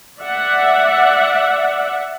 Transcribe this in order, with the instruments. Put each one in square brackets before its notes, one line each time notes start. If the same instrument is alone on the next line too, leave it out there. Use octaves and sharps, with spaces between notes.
[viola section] D5 E5 F#5